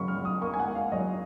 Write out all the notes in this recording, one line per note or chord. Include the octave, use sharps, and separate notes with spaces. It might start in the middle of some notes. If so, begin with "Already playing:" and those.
Already playing: C#3 F#3 A#3 B5 C#6
F6
F#3
D#6
A#3 C#6
G#5
F#5
A#3
F5
F#3 D#5